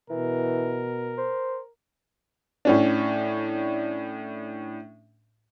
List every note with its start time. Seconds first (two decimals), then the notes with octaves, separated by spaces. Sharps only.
0.10 B2 E3 A#4
1.18 C5
2.65 A2 C#4 D4